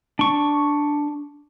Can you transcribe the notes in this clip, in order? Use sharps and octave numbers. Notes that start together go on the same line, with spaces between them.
D4 C#6